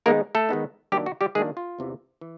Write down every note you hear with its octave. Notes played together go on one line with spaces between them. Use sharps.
D#3 G#3 A#3 B3 D#4 A#4
A3 A4
D#3 G#3 B3 D#4
D#3 F#3 G3 A#3 D4 G4
F#4
G3 G4
D#3 F#3 G#3 A#3 D4 G#4
F4
E2 C3 E3
E3